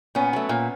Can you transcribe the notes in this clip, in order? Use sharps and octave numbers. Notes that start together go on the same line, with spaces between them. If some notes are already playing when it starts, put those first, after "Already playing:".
A#2 B3 C#4
F#3 A3
A#2